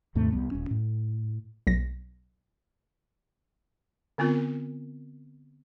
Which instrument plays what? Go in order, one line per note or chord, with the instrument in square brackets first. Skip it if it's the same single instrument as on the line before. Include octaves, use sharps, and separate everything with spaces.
[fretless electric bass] D#2 G#2 C3 A3
C2 G3 B3
D#1 C#4
A2
[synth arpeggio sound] B1 A#6
[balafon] D3 B3 C4 F4 A#4